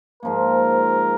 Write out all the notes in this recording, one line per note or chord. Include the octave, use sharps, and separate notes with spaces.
G#2 F3 A#3 A#4